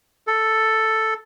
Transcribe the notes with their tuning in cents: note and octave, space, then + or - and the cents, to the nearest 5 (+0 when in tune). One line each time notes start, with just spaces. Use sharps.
A4 +5